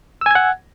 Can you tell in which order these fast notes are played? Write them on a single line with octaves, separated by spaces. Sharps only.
E6 G#5 G#6 F#5